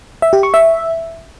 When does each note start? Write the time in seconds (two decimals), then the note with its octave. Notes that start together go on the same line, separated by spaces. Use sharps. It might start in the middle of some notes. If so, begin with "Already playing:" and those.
0.22 E5
0.33 G4
0.43 C#6
0.54 E5